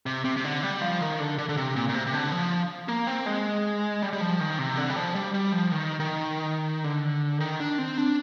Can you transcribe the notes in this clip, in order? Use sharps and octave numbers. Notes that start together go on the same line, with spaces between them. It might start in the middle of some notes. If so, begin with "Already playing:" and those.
C3
C3
C3
D3
G3
F3
D#3
D3
D3
D3
C3
A#2
A#2
C3
C3
D3
F3
A#3
C4
G#3
G3
G3
F3
D#3
C3
D3
G3
F3
G3
G3
F3
D#3
D#3
D3
D#3
D4
C4
D4